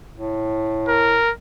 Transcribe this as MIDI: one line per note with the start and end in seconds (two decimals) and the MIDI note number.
0.13 1.23 45
0.88 1.31 70